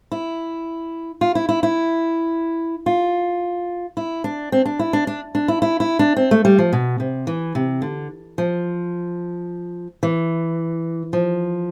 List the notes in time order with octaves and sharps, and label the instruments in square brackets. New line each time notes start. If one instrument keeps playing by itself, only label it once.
[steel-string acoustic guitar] E4
F4
E4
E4
E4
F4
E4
D4
C4
D4
E4
D4
D4
D4
E4
E4
E4
D4
C4
A3
G3
F3
B2
C3
E3
C3
D3
F3
E3
F3